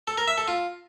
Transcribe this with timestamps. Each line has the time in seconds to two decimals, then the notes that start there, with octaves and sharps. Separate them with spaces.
0.08 A4
0.18 A#4
0.28 E5
0.38 A4
0.48 F4